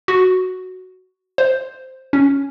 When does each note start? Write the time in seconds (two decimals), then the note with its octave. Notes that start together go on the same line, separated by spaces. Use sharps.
0.08 F#4
1.38 C5
2.13 C#4